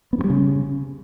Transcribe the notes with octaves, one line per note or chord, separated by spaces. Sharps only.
B3
G2
G3
C#3